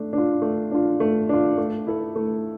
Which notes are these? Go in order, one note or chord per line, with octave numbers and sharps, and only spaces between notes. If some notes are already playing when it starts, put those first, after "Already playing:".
Already playing: A3 D4
D4 F4
A3
D4 F4
A3
D4 F4
A3
E4 A4
A3